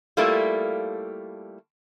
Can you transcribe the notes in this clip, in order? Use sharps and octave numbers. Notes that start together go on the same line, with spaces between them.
G3 A3 A#3 E4 F4 A4